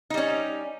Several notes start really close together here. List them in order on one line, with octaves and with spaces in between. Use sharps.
D#4 G3 C#4